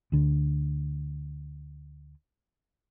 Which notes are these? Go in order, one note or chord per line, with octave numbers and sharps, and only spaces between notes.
D2 D3